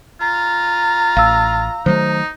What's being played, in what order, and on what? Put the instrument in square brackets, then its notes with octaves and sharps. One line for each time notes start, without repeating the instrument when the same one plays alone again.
[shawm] F4 [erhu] A#5
[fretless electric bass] A1 [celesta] F5 E6
[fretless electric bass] D#3 F#3 A3 [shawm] D#4 [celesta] C5